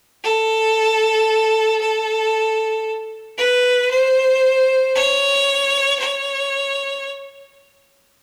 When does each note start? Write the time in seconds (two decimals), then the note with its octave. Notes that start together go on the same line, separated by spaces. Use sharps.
0.24 A4
1.81 A4
3.38 B4
3.91 C5
4.95 C#5
5.99 C#5